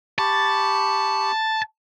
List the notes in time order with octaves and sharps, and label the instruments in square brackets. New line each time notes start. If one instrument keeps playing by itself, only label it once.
[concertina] G4 B5 C#6 [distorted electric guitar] A5